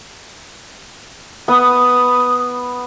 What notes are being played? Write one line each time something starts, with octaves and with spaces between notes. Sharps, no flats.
B3 D#6